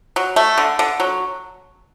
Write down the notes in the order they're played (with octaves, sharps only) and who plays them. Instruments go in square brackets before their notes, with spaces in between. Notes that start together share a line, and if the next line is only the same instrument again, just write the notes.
[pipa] F#3
A3
D3
D3
F#3